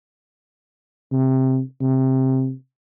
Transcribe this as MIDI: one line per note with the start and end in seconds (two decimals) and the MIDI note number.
1.12 1.60 48
1.82 2.52 48